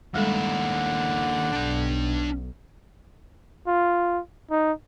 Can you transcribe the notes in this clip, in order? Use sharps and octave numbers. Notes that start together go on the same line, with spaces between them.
D#2 D3 G3 G#3 E4 A4 F#5
B1 D4 G5
F4
D#4